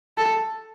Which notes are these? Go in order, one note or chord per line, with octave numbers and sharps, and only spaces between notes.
A4